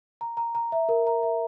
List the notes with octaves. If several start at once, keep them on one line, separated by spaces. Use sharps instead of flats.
A#5
A#5
A#5
E5
A#4
A#5
E5